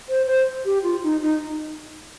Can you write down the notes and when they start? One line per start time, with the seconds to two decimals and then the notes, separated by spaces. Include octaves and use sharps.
0.09 C5
0.27 C5
0.65 G4
0.83 F4
1.03 D#4
1.21 D#4